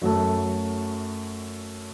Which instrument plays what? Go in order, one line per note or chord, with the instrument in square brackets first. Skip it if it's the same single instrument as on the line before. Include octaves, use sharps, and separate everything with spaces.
[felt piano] F#2 F#3 A3